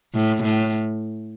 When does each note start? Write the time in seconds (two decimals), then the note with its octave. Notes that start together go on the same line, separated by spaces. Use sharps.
0.15 A2
0.43 A2